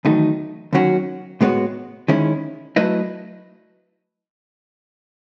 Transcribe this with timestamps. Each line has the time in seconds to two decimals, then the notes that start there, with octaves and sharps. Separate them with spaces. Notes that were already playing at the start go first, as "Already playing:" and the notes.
0.05 E2 D#3 F#3 A3 D#4
0.73 D#2 D#3 F#3 C#4 F#4
1.41 A2 G#3 B3 F#4 C#5
2.08 D#3 G#3 C#4 E4
2.76 F#3 A3 E4 B4 D#5